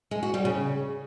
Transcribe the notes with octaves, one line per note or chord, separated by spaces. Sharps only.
G#3
F#4
G3
C#3